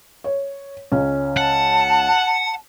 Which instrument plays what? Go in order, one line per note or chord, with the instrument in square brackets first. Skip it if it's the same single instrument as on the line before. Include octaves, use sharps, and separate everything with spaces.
[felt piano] C#5
C#2 C#4
[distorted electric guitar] F#5 [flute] A5